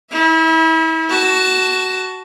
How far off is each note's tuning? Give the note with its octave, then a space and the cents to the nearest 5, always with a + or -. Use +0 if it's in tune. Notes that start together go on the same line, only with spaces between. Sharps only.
E4 -35 E5 -10
F#4 +15 A5 +0